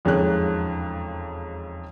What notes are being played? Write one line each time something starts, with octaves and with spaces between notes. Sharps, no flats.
E1 F2 G#2 C#3 C#5 F#6